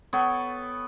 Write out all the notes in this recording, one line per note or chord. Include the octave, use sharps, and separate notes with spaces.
B3 A4 C#5 G5